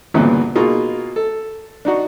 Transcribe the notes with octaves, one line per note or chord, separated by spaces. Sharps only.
D2 G2 A#2 C#3 E3 B3
B2 A#3 D#4 F4 G#4
A4
D4 D#4 F#4